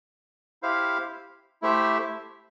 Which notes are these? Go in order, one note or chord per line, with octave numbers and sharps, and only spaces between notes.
E4 G4 C5 F5
A3 E4 G4 C5 E5